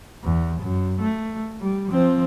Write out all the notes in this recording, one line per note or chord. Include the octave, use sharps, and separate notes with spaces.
E2
F#2
A3
G3
F3 C4